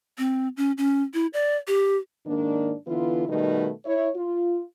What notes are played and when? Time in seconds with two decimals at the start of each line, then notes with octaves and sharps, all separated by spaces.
0.18 C4
0.57 C#4
0.78 C#4
1.14 E4
1.33 D5
1.68 G4
2.27 G#2 D#3 A#3 D4
2.87 D3 E3 B3 E4 F4
3.29 B2 D#3 G3 A3 B3 D#4
3.85 E4 C#5
4.16 F4